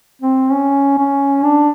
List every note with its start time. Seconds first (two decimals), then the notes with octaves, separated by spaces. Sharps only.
0.22 C4
0.52 C#4
0.98 C#4
1.44 D4